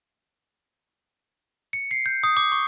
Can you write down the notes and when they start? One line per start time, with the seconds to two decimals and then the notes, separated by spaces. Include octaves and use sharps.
1.73 C#7
1.91 C7
2.06 G6
2.23 D#6
2.37 D6
2.52 C#6